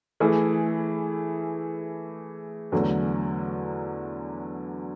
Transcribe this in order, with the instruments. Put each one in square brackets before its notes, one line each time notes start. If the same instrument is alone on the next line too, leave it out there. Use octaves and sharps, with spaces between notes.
[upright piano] E3 A3 E4 G#4
E2 D3 F#3 A3